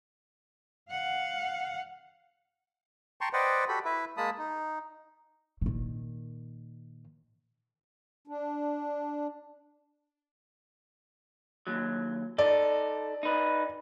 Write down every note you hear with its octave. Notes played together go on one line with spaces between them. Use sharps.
F5 F#5
G5 A5 A#5 C6 C#6
B4 C5 D5 D#5 F#5 G5
F#4 G4 A4 B5
E4 B4 E5
G#3 A#3 A5 B5 D#6
D#4
A#2 D#3
D4
D#2 F#3
D#4 A4 D5
D#4 B4